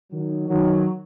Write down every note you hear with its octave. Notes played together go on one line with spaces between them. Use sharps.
D#3 F#3
D#3 F#3